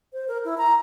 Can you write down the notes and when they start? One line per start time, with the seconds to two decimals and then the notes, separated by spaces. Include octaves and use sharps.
0.13 C5
0.28 A#4
0.45 E4
0.58 A#5